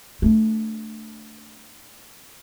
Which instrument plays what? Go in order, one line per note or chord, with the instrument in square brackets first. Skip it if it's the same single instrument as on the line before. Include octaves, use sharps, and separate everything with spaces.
[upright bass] A3 D4